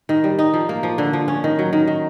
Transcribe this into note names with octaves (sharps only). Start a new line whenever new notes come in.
D#3
G3
D#4
F3
A#3
F3
D3
F3
C#4
D#3
F#3
D#3
D#3